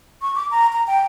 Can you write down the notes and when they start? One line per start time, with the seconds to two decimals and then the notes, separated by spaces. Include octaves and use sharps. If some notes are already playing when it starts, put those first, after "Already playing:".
0.22 C#6
0.35 D6
0.51 A#5
0.73 A#5
0.87 G5